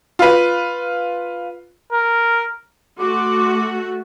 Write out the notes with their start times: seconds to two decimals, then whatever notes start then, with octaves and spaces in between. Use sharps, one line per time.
0.19 F4 B4
1.92 A#4
2.99 A3 F#4 C6 D6